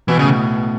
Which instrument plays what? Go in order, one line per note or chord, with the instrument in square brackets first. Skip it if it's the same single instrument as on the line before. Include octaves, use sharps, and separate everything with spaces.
[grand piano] B2 [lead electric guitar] E3
[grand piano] A2 [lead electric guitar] C#3